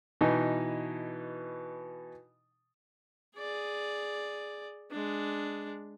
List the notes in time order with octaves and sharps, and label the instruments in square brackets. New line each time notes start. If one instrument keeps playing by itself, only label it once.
[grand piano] B2 E3 D#4
[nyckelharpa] G#4 D5
G#3 D4